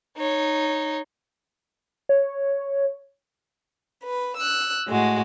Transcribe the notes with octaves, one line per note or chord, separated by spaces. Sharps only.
D#4 C#5
C#5
B4
E6 F#6
A2 G#3 F#4